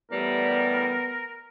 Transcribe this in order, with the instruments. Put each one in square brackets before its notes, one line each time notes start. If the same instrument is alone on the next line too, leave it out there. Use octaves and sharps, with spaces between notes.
[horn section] A2 E3 G3 [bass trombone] B3 [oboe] A#4